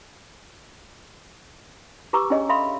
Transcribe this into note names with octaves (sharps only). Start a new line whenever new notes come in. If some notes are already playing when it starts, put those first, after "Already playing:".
G4 B4 A#5 C#6 D6 E6
C#4 D4 G#4 C#5 D#5
A4 E5 F5 B5 C6